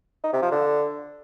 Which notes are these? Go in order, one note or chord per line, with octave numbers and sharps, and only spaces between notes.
D#4
C3
F3
D3